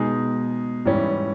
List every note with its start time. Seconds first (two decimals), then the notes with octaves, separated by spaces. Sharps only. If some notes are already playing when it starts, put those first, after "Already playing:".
Already playing: B2 G#3 D#4 G#4
0.85 G#2 E3 G3 C#4 E4